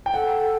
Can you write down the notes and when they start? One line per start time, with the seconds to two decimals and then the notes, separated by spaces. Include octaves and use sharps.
0.06 G5
0.13 A4 F#5